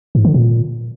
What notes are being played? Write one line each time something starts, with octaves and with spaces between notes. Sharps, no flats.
G#2
D3
A#2